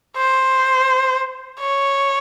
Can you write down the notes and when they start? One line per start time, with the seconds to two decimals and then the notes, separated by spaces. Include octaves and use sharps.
0.17 C5
1.60 C#5